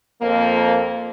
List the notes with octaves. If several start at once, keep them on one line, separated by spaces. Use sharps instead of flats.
F2 A#3